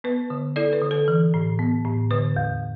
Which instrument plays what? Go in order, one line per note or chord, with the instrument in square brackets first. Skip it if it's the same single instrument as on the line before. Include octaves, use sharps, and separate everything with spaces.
[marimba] B3 B4
D3
E4 A4 D5
B4
D3
A4
E3
A2
B3
A2
D3 B4
E2